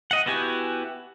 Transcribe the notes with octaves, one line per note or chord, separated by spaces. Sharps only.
D#5 F#5
B3 E4 F#4 G4 G#5